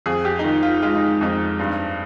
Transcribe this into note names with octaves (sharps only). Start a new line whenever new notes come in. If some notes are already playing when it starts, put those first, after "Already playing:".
F2 G#4
G4
D#4
D#3 F4
F4
G#3 F4
D#4
F2 D#4
G2